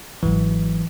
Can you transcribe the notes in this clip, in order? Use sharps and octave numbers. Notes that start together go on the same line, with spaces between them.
G#1 E3 F#3